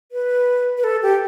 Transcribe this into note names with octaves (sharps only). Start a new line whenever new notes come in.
B4
B4
A4
G4